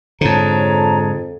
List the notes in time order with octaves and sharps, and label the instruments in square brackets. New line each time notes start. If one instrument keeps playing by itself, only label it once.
[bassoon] F2 [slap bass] G#2 D3 [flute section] C#5 A5 A#5